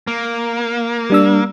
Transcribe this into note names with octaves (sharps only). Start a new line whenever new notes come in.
A#3
G3 D4 E6